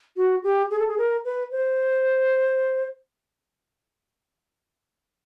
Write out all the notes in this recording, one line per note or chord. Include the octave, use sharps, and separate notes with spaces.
F#4
G4
G#4
A4
G#4
A#4
B4
C5